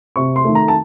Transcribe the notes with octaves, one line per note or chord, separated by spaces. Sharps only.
C3 C#6
C6
D#3 A3
A#5
A5